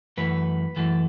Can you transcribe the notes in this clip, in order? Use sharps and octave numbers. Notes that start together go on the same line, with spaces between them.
F#2 E3 A3 B4
F#2 E3 A3